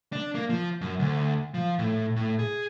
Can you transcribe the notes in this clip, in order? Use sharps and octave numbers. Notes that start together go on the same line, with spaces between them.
D4
A#3
F3
F#2
D2
F3
A2
A2
G#4